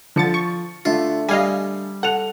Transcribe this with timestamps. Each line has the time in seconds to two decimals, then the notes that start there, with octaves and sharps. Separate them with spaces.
0.16 D3 F3 A6 C#7
0.34 C#6
0.85 D3 A3 D4 F4
1.29 G3 D#5 F5 G#5
2.03 A4 F#5 F7